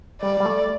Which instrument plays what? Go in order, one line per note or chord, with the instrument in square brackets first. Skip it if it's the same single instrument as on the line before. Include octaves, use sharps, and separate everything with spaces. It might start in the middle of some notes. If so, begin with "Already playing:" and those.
[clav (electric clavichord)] G3 [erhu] D5
[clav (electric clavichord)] G3
A3